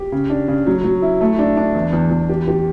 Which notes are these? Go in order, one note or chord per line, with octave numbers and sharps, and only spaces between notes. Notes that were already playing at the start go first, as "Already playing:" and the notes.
Already playing: G4
C#3
D4
C#3
F#3
F#3
E4
A3
D4
D4
E2
E2
E2
G4
G4